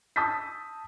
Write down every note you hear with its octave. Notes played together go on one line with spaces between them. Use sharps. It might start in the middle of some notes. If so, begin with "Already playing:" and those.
A5 D#6 E6 G6 A6 B6